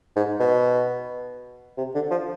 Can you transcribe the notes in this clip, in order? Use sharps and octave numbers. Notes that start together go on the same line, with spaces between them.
G#2
B2
C3
D3
F3